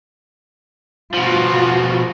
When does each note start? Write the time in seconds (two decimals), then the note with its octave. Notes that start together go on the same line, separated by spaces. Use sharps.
1.14 B2 F3 F4 F#4